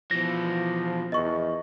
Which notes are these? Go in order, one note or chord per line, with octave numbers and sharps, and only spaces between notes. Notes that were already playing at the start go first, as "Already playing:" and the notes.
B2 E3 F3 A#6
E2 D#5 C#6